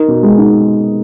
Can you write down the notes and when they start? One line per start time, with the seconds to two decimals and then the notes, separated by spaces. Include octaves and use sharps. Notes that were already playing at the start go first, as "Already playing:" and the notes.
Already playing: D#4 A#4
0.08 B2
0.23 G#3
0.38 D#4